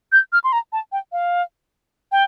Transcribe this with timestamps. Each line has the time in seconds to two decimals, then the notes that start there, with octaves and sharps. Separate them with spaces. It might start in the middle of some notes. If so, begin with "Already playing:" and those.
0.12 G6
0.33 F6
0.44 C6
0.53 A#5
0.73 A5
0.92 G5
1.12 F5
2.12 G5